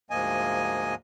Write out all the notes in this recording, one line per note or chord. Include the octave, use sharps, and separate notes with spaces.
D2 G#2 F3 A#3 D#5 G#5